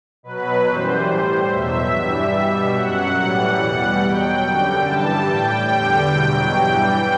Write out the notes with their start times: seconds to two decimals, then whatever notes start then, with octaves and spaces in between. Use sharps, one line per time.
0.23 B2 F#3 B4
0.65 F#2 E3 G3 C5
1.08 A2 G3
1.49 E2 B2 F#3 E5
1.91 G2 E3 G3
2.33 B2 G3
2.75 F#2 F#3 F#5
3.17 A2 E3 G3 F#5
3.59 E2 B2 G3
4.00 B2 F#3 G5
4.42 F#2 D3 G3
4.84 G2 E3 G3 A5
5.25 A2 G3 G5
5.68 E2 D3 G3 G5
6.10 E2 B2 F#3
6.52 G2 E3 G3